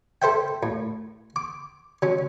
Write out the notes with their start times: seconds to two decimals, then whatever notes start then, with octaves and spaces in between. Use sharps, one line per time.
0.22 A4 C5 E5 G5
0.63 A2
1.36 D6
2.02 F#3 C#4